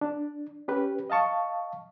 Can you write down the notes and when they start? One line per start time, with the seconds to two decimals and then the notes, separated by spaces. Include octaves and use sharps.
0.01 D4
0.68 C#4 G4 B4
1.10 D#5 F5 A5 C#6